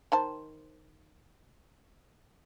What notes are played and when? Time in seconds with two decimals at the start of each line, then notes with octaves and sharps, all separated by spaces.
0.12 D#3 C5 A5